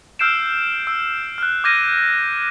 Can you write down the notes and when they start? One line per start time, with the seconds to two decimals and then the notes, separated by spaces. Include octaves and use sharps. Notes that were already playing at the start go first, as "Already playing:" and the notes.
0.19 E6 F6 G6 C7 D7 E7
0.87 E6
1.38 F6 F#6
1.64 D6 F6 G6 G#6 A#6 D#7